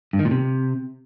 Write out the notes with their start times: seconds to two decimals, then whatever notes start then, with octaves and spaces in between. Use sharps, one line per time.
0.13 G2
0.19 D#3
0.25 A#2
0.31 C3